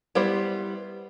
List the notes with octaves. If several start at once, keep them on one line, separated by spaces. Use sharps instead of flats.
G3 B3 E4 C5